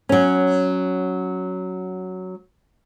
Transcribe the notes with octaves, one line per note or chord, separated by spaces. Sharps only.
F#3 C#4